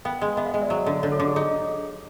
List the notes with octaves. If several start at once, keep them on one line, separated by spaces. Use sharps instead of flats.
B3 F5 G5
G#3
B3 E5 F#5
D#5 F5
G#3
D5 E5
F#3
D3
D3 C#5 D#5
A4
D3 G#4
G4
D#4 G#4